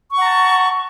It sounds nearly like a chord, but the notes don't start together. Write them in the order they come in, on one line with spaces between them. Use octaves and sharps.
C#6 F#5 A#5 A5